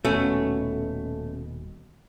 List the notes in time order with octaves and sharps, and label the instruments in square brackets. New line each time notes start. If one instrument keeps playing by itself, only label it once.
[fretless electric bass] D#1 B2 [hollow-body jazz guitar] A3 C#4